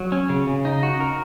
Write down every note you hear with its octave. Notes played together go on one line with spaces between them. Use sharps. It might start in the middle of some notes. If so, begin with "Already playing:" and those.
Already playing: F#3
C#4
C#3
C#3
D#4
F#4
A#4